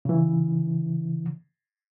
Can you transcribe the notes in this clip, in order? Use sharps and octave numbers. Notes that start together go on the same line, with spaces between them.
C#3 E3